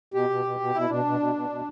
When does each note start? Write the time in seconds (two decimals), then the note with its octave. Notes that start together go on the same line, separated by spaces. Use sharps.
0.14 B2 G4
0.30 B2
0.45 B2
0.60 B2
0.74 B2 E4
0.89 B2 D4
1.05 B2
1.20 B2
1.35 B2
1.50 B2